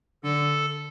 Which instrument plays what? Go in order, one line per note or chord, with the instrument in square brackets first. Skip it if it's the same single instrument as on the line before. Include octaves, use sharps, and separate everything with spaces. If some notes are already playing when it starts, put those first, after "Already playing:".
[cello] D3 [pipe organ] A4